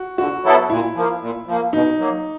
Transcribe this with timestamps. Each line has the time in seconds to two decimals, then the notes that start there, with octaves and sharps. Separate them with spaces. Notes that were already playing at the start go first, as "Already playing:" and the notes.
Already playing: F#4
0.18 D3 F#4
0.44 F#3 B3 E4 A4
0.70 A#2 E4
0.95 F3 A#3
1.21 A#2
1.47 F3 A#3
1.73 B2 D#4
1.99 F#3 A#3